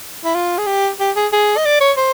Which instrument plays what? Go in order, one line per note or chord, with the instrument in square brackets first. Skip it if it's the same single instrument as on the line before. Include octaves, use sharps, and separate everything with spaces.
[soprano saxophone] E4
F4
G#4
G4
G4
G#4
G#4
D#5
D5
C#5
C5